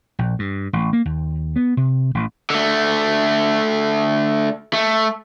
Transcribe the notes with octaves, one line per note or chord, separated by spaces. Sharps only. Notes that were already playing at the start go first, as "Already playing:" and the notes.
A#1
G2
A1
A#3
D#2
B3
C3
A1
D3 A3
A3